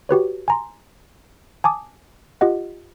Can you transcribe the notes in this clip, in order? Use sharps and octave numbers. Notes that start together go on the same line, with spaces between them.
F#4 G4 B4 C#5
G#5 A#5 C6
G#5 A5 D6 D#6
F4 G4 D#5 F#5